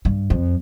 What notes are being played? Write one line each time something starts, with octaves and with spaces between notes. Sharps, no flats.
G2
F2